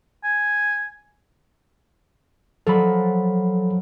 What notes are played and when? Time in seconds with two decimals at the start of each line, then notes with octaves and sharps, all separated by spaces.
0.24 G#5
2.67 F3 F#3 A4 B5